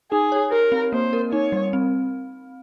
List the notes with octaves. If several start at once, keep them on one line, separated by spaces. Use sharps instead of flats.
D#4 G#4
C#5
G4 A#4
C4
A#3 C5
A#4
D#4 C#5
G3
C4